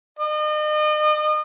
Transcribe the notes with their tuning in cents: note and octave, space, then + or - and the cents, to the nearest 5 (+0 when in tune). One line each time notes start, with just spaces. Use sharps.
D#5 -40